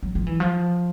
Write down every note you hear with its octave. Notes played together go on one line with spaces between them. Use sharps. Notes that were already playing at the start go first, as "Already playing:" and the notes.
F#3
F3
E3
F3